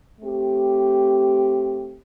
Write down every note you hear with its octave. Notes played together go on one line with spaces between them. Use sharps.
A3 C4 G4